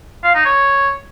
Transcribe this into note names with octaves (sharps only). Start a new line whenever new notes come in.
F5
D#4
C#5